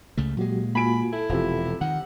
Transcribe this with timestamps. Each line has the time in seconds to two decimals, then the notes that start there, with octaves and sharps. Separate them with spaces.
0.17 C#2 C#3 A3
0.37 A#2 F#3 G#3 F#4 G4
0.75 A#3 F4 F#4 G#5 B5 D7
1.13 E4 A4
1.29 E1 C3 F3
1.81 D#3 F#5